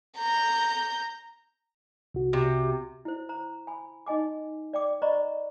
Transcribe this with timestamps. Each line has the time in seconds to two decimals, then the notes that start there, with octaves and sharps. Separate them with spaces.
0.17 A#5 G6
2.14 C2 F#4
2.33 C3
3.05 E4 C5
3.29 C5 A#5
3.67 G#5 B5
4.06 D#4 D#5 G#5 D6
4.73 D5 G5 D6
5.02 C5 D5 D#5 A#5 B5 C#6